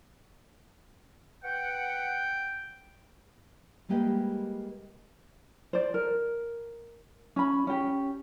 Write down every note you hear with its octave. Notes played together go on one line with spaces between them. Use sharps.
B4 F#5 G5
G3 G#3 A#3 G4 B4 D#5
C5 D5
A#4
C#4 B5
C#4 G4